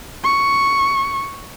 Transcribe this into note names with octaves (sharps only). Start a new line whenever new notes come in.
C#6